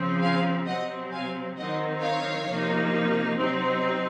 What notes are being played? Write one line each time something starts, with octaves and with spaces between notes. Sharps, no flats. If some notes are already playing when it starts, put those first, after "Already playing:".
Already playing: C#3 F3 C4
F5 G#5
C3 F#3 C4 D#5 F#5
F5 G#5
D#3 F#3 C4 D#4 D#5 F#5
C#5 F5
C3 F3 A#3 D#4
C3 F#3 C4 D#4